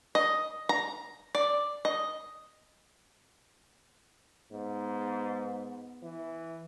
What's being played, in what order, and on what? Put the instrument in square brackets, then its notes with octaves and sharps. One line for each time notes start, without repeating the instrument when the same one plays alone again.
[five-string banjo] D#5
A#5
D5
D#5
[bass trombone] G#2 [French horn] B3
[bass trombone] E3